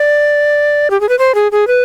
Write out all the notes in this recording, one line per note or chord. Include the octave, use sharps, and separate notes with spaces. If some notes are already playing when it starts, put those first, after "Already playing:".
Already playing: D5
G4
G#4
B4
C5
G#4
G#4
B4